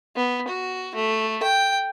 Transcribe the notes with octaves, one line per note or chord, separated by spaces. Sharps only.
B3
F#4
A3
G5